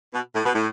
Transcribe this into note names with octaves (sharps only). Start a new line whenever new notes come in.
B2
A2
B2
A2